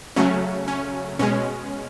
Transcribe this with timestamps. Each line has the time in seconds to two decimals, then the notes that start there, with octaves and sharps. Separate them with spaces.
0.16 C#3 F#3 A3 C#4
0.68 C#4
1.19 B2 G#3 C#4